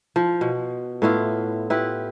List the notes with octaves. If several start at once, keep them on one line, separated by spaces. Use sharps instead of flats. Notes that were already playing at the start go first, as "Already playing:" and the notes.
F3
B2
A2 B3 E4 F4
E4 F4 G4 B4